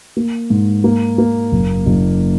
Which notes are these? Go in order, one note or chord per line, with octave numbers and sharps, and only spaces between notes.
A#3
G#2
A#3
A#3
F#1
F#1